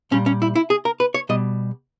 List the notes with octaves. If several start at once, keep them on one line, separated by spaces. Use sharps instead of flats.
A#2 G3 C#4
C#4
E4
E4
G#4
A#4
B4
C#5
B2 G3 D#5